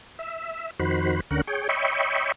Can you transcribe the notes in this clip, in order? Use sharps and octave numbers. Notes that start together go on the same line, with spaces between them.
E5
F2 D#3 F#4 C5 B5
D2 D3 C#4 A#4 F#5
G#4 C#5 G5
C#5 D#5 E5 G5 B5 C#6